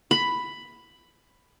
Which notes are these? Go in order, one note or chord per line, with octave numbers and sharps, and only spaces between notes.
B5